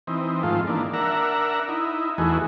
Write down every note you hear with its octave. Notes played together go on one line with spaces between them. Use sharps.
E3 C4 D#4
G#2 D#3 F3 A3 F4
D#3 E3 A#3 D4
D4 A#4 E5 F#5 A#5
D#4 E4
E2 E3 A3 D#4 F#4 G#4